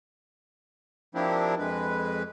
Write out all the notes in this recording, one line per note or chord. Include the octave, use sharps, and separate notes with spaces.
F3 A#3 C4 D4 E4 G4
F2 G#3 B4